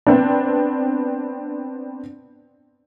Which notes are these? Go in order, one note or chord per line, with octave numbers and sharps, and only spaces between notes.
B3 C4 D4